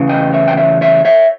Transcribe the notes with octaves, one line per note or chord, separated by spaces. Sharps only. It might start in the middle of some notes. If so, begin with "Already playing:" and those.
Already playing: E2 C#3 E3
D#5 G5
C#5 E5
G5
C#5 E5
C#5 E5
C#5 E5